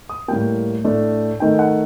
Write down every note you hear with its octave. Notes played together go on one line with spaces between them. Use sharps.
D#6
A2 G3 A#3 G5
A2 A3 D4
D#3 A3 D#4 G5
F#5